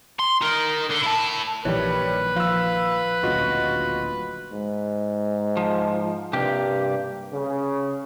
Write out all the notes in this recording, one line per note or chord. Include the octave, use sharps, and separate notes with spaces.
C6
D#4 A#4
D3
E4 A5
A#1 D#3 E3 G3 B4 C#5
F3 F5 E6
D1 A#1 C#3 F4 F#4 D#5
G#2
F3
G2 C3 A#3 G4
C#3